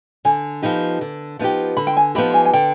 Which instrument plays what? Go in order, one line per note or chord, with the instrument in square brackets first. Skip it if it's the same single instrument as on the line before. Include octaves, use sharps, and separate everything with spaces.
[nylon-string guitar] D3 [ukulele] G#5
[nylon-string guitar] F3 B3 D#4 G4
D3
F3 B3 D#4 G4
[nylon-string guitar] D3 [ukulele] B5
[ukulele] G5
G#5
[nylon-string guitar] F3 B3 D#4 G4 [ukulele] B5
[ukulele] G#5
G#5
[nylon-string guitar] D3 [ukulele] G5